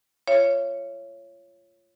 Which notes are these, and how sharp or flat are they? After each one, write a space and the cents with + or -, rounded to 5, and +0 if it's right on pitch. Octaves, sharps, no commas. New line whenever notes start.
F4 -20 C#5 +0 E5 +45